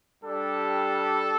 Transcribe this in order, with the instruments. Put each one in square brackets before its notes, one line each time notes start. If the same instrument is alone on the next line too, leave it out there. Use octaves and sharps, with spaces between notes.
[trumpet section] G3 D4 G4 A4